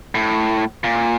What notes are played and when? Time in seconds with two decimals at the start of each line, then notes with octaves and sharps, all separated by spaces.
0.15 A2
0.84 A#2